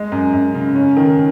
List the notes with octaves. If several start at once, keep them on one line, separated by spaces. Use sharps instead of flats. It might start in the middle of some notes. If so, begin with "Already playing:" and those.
Already playing: G#3
F#2
F#2
C#3
C#4
D#3